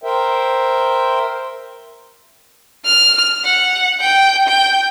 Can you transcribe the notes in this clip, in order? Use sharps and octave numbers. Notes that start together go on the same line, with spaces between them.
A#4 C5 E5 G5
F6
F#5
G5
G5